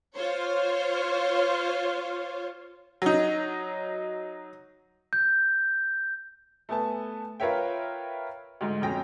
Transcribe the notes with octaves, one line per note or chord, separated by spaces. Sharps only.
F4 C5 C#5
F#3 D#4
G6
A3 B3 G#5 A5
F4 A#4 B4 C#5 E5 G5
D2 G#2
F2 B2 C#4 G5 A#6